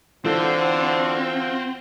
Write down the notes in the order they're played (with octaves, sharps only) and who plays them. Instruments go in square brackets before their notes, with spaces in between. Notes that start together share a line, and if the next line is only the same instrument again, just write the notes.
[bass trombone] D3 [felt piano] E3 A4 [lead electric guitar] C4 [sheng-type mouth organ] F4 F#4